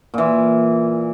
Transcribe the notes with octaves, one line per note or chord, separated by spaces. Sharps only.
A#2 E3